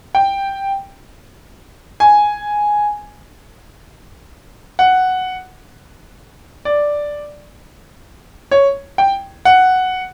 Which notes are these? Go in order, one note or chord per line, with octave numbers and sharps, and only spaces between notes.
G5
G#5
F#5
D5
C#5
G5
F#5